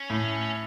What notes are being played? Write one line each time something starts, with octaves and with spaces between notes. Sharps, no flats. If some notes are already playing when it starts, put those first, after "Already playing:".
Already playing: C#4
A2